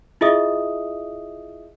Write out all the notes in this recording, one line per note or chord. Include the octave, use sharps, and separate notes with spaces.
E4 F4 G#4 D#5 E5 D#6